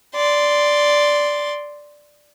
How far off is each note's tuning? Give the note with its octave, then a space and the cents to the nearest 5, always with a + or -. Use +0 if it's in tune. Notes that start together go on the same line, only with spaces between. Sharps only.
D5 +0 C6 -5